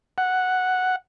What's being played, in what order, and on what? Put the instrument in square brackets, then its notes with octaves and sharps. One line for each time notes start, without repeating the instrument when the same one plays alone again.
[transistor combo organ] F#5